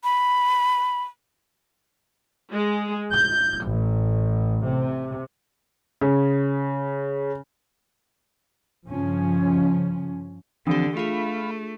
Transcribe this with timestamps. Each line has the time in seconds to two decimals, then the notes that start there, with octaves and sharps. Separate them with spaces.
0.04 B5
2.52 G#3
3.12 G6
3.65 A1
4.65 C3
6.01 C#3
8.87 G2 C#3 F3 C#4
10.67 D3 E3 F3 C4 D4 G4 D#6
10.97 A3 F4 G#4 F5 B5